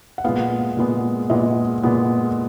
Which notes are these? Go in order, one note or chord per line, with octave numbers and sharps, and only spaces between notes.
F#5
A#2 G#3 B3 F5
A#2 G#3 B3
A#2 G#3 B3 D#5
A#2 G#3 B3